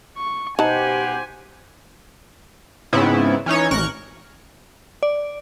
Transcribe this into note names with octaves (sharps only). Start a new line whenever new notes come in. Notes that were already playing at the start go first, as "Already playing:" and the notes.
C#6
B2 D#4 G4 C5 F#5 G#5 A5
G#2 C#3 B3 C4 E4
E3 C#4 D#4 C#5
A1 A#4 C#6 F#6
D5